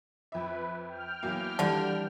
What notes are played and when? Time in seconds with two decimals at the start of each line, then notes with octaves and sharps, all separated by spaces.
0.32 F2 B4 E5
0.88 G5 F6
1.23 E2 F#3 A#3
1.59 D3 E3 G3 D4